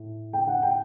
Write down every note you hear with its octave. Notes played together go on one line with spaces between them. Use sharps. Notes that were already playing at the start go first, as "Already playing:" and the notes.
Already playing: A2
G5
F#5
G5